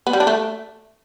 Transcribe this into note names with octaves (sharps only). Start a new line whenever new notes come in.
B3
G3
D4
A3